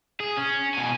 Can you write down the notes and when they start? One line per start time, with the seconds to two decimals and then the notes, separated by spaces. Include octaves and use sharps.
0.20 G#4
0.37 C#4
0.74 B2 G#5